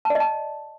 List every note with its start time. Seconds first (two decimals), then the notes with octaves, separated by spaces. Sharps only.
0.05 A5
0.10 D5
0.15 D#5
0.20 A5